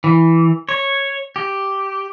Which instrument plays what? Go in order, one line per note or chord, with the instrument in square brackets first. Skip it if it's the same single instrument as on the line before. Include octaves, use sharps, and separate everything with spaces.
[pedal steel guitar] E3
C#5
G4